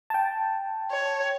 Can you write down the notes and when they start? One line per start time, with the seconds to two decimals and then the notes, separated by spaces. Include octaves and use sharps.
0.10 G5 A5
0.91 C#5